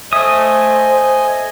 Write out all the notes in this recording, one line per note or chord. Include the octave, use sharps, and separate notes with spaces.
A4 C5 D#5 E5 G#5 D#6